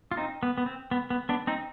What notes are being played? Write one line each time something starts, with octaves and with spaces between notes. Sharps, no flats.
F4
C4 D#4
B3
B3
C4
B3
B3
B3 D4
C4 D#4